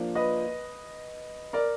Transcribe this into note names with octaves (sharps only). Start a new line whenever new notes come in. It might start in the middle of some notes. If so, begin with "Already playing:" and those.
Already playing: F3 A#3 D4
B4 D#5
A#4 D5